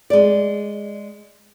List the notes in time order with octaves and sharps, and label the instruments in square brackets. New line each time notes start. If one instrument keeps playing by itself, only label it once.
[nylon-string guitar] G#3 D5